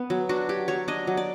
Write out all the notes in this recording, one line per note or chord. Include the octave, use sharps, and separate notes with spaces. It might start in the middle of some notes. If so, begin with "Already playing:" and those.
Already playing: B3
F#3
D4 F#4
F#3 G4
F#3 C#5
D4 D#5
F#3
D5